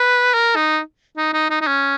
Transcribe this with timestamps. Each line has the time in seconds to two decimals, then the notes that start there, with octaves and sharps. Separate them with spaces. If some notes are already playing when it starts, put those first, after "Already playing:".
Already playing: B4
0.34 A#4
0.56 D#4
1.17 D#4
1.33 D#4
1.50 D#4
1.61 D#4
1.67 C#4